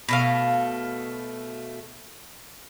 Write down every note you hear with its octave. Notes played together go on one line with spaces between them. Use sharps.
B2 A3 F5